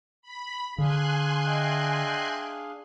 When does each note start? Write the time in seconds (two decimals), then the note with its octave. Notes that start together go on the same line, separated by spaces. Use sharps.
0.22 B5
0.78 D3 D4 G#4 F5 G#5 C6 F#6
1.46 D#5 E5 G5